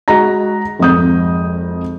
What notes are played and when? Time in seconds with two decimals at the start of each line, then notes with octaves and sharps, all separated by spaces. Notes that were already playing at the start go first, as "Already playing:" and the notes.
0.08 G#3 F#4 D#5 A#5 A#6
0.79 G#1 F2 D#6 G6